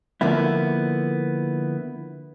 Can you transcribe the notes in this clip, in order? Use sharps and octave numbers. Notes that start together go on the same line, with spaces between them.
D3 F3 A#3 B3 E4